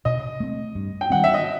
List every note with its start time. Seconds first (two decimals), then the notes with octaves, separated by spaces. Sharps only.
0.05 B2 D#5
0.40 A3 C4
0.75 G2
1.01 G5
1.10 D#3 G3 C4 F#5
1.24 E5
1.34 D#5